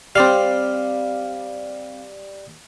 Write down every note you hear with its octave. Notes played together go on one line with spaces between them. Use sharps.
G3 C4 D5 F5